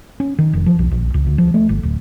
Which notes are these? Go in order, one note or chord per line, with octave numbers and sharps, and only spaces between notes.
C#4
D#3
F1
F3
B1
A#1
C#2
D2
F3
A3
G1
D1